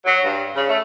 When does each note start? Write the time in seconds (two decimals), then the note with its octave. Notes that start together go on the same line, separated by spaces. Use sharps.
0.05 F#3
0.24 G2
0.56 C#3
0.69 A3